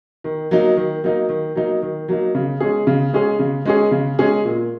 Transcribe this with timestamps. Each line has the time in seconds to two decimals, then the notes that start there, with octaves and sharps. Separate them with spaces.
0.24 D#3
0.51 F#3 A#3 D#4
0.77 D#3
1.04 F#3 A#3 D#4
1.29 D#3
1.56 F#3 A#3 D#4
1.82 D#3
2.08 F#3 A#3 D#4
2.35 C#3
2.60 G#3 C#4 G#4
2.87 C#3
3.13 G#3 C#4 G#4
3.39 C#3
3.65 G#3 C#4 G#4
3.91 C#3
4.19 G#3 C#4 G#4
4.45 A#2